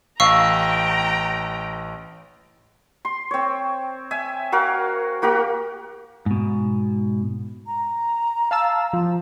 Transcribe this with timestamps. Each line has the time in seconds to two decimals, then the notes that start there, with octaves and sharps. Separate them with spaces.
0.20 A1 F5 G5 A#5 C#6 E6
3.05 C6
3.31 C4 C#5
4.11 E5 G#5
4.52 F#4 A#4 F5
5.22 A#3 F#4 G4 A#4
6.26 G#2 B2
7.66 A#5
8.51 F5 A5 E6
8.93 F3